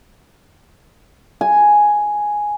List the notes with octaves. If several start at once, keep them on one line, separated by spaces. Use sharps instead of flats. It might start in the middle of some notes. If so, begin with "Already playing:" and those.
G#5